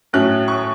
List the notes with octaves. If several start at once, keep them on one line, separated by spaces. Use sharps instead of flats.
A2 F#3 A3 C#4 F#6
C#6